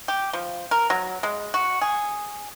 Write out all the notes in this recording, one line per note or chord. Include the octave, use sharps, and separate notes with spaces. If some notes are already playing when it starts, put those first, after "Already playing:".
G4
F3
A#4
F#3
G#3
F#4
G#4